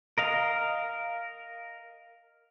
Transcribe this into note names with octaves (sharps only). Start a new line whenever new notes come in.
A#4 D#5 F5